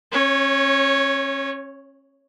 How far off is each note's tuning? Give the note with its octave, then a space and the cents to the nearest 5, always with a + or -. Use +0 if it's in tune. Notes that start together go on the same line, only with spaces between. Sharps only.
C#4 -30 C#5 +0